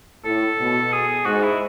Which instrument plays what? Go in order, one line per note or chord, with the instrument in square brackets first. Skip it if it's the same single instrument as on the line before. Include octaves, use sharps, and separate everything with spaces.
[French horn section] A2 [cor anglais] A4
[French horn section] B2
[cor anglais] G#4
[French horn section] G#2 [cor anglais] F#4
[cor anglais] E4